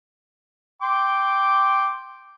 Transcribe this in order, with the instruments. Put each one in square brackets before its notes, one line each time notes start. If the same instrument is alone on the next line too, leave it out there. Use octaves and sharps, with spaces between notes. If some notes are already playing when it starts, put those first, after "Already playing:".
[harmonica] G5 C6 D6